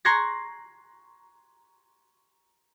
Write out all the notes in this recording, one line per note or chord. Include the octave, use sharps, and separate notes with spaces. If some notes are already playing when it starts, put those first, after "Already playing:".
A#5 C6 C#6 F#6 G#6 A#6